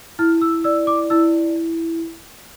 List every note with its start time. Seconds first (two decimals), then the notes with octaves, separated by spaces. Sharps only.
0.19 E4 F6
0.42 E6
0.64 D5 E6
0.87 D6
1.10 E4 E6